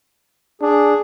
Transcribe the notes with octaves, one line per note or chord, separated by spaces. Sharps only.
D4 G#4